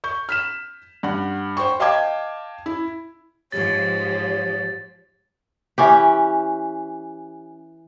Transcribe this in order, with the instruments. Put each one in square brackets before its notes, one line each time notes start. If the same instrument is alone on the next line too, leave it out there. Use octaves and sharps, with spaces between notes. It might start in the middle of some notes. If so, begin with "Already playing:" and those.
[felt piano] C#6 G6
F6 B6 E7
G2 F#5
C5 G5 C#6
D#5 F5 G5 A5 D6 G#6
E4
[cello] G#2 F3 [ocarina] G4 [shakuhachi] C#5 [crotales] A6
[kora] E3 C#4 G4